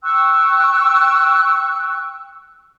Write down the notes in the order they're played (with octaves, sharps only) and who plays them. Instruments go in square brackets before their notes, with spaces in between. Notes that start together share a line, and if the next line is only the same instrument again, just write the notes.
[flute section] G5 C#6 E6 F#6